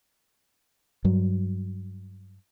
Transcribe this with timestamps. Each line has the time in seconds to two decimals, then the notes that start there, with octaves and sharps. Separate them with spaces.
1.04 G2 F#3